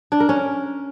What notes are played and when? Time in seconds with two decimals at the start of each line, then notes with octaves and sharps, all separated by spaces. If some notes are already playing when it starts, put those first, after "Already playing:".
0.12 D4
0.20 A#4
0.29 C#4